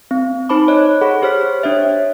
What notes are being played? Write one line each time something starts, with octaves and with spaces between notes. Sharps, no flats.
C4
D#4 C5 A5 B5 D6
C#5 D#5 F#6
G#4 A4 F#5 B5
G4 C5 C#5 F6 B6
D4 C5 C#5 E5